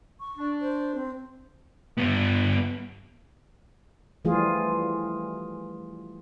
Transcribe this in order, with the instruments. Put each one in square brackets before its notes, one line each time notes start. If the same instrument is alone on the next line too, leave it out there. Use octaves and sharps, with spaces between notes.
[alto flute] C#6
[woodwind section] D4
[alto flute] C5
C4
[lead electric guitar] G2 B3
[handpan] E3 F3 G3 A3 F4 G#4